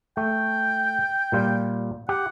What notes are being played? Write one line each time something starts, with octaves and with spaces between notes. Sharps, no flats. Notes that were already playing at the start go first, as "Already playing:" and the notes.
A3 G5
A#2 G3 F4
G4 F#5